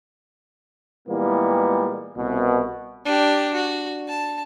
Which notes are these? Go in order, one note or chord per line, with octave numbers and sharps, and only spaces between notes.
A#2 E3 G3 G#3 A#3 B3
C2 B2
D4 G4
F#4
A5